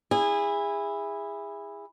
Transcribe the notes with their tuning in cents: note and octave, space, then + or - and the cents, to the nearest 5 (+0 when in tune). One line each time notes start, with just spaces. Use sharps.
E4 +0 G#4 -25